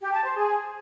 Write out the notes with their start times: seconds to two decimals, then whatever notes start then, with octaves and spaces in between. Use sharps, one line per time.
0.01 G4
0.12 A5
0.24 C5
0.35 G#4